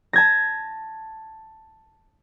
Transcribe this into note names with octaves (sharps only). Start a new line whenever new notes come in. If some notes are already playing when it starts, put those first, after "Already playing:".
A5 G#6 A#6